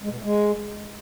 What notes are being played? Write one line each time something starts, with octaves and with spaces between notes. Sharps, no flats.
G#3
B2
A2
G#3